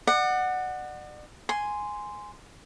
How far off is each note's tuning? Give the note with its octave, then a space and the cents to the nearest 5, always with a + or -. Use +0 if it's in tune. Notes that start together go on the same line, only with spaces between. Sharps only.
D5 +40 F#5 +0
G#5 +0 C6 -10